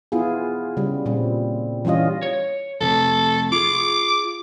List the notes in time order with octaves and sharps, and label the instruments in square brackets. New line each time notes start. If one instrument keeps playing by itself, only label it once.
[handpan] B3 E4 F4 G#4
C#3 G3
A#2 G3 C4
E3 G3 C#4 F4 D#5
[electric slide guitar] C#5
[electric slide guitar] F2 C3 A3 [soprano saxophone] A4
[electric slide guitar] F4 G#4 [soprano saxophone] D6